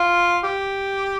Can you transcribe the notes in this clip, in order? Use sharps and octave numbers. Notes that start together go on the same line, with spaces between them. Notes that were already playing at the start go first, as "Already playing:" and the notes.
Already playing: F4
G4